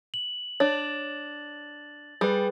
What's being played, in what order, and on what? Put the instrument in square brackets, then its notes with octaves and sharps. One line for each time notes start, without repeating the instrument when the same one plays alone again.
[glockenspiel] F#7
[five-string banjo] D4 [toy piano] C#5 [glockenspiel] A6
[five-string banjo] G3 [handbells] G#4 B4